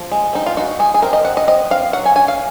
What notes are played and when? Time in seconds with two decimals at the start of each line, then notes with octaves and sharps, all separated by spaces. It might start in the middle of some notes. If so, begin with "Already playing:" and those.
Already playing: F3 F4
0.12 G#3
0.33 C4 D#4
0.46 F4
0.57 D#4 F#4
0.79 G#3 G#4
0.94 G#4
1.02 C4 A#4
1.13 D#5
1.25 C4 F#5
1.37 D#5
1.47 C4 D#5
1.71 C4 F5
1.93 F#3 F#5
2.05 G#5
2.16 C#4 G#5
2.28 F5